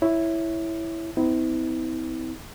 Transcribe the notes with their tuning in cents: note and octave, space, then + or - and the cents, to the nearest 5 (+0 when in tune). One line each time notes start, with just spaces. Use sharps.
E4 +0 C#5 +0
C4 -45 E4 -40